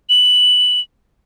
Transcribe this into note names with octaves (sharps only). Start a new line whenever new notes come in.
F#7